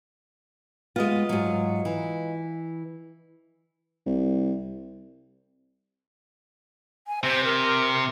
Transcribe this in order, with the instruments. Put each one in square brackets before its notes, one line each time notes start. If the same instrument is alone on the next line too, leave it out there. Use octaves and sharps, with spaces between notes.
[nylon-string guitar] G#3 B3 [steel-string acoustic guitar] F4 D#5
[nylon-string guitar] G#2 F#3
E3
[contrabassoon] C2
[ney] G#5
[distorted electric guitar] C3 [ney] C5
[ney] A#4